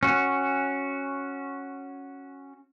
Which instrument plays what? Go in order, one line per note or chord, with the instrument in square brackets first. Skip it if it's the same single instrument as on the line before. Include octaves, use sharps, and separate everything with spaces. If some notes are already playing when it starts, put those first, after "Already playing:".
[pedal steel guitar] C#4 F#4